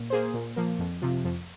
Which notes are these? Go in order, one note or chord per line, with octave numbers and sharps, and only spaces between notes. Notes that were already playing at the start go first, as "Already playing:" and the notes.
Already playing: A#2
A#3 G#4 C5
A#2
F3 A#3
F2
C3 F3
F2